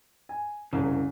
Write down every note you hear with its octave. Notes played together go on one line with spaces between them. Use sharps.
G#5
F#1 C2 C#3